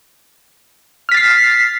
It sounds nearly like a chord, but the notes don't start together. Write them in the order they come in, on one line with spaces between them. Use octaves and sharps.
F6 B6 A6 C7